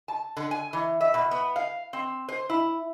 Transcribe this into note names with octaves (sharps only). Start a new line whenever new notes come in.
A5
D3
G#5
E3
E5
B2
B3
F5
C4
C5
E4